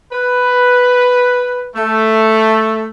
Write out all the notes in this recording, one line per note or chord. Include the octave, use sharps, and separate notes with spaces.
B4
A3